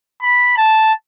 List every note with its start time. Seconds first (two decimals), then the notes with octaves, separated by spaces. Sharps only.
0.22 B5
0.57 A5